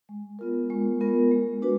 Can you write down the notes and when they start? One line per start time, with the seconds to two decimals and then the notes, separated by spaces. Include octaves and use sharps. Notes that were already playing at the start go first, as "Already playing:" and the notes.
0.09 G#3
0.39 B3 F4 A#4
0.70 G#3
1.00 B3 F4 A#4
1.31 G#3
1.62 D4 F#4 B4